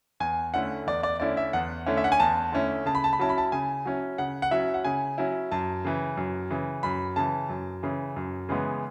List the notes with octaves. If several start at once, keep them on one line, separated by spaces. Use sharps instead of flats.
E2 G#5
D3 A3 C#4 E4 F#5
E2 D5
D5
D3 A3 C#4 E4 D5
E5
E2 F#5
D3 A3 C#4 E4
E5
F#5
G#5
E2 A5
D3 A3 C#4 E4
C#3 A5
B5
A5
B5
F#3 C#4 E4 A5
B5
A5
C#3 G#5
F#3 C#4 E4
C#3 F#5
F#5
F#3 C#4 E4 E5
F#5
C#3 G#5
F#3 C#4 E4
F#2 A5
C#3 E3
F#2
C#3 E3
F#2 B5
C#3 E3 A5
F#2
C#3 E3
F#2
C#3 E3 G#3 B3